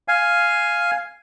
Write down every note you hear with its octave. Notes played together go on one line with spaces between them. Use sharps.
F5 G#5